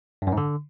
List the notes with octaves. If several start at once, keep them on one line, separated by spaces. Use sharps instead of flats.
G2
F#2
G#2
D3